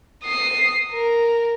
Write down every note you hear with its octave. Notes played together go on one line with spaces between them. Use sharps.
D#6 C7
A#4